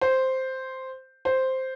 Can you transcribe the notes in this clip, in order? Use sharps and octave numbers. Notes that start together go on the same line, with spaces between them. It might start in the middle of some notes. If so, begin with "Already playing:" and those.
C5
C5